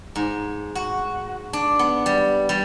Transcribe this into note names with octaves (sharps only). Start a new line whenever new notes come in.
G#2
F#4
D4
B3
G3
G3